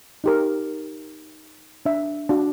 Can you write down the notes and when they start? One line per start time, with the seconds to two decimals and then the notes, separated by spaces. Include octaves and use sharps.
0.24 D#4 G4 A#4
1.86 D4 E5
2.29 D4 F#4